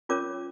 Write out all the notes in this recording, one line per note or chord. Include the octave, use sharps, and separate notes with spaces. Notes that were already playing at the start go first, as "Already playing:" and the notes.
C#4 F4 A#4 C#5 D6